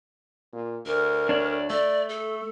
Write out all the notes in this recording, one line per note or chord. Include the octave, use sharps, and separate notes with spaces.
A#2
D2 A#4
D4 C#5 D5
A3 D5
A4